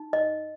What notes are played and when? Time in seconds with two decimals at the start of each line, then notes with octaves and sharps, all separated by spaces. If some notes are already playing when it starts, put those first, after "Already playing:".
Already playing: D#4
0.13 D#5